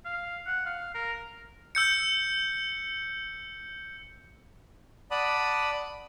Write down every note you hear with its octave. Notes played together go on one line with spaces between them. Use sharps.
F5
F#5
F5
A#4
E6 G6 C#7
D5 F#5 A5 B5 D#6